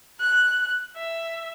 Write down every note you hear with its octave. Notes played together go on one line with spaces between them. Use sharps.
F#6
E5